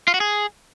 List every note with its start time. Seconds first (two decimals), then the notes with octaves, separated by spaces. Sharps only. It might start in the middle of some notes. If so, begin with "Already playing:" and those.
0.08 F4
0.14 F#4
0.20 G#4